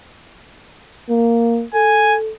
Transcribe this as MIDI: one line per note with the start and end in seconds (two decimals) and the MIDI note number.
1.09 1.64 58
1.74 2.31 69
1.74 2.17 80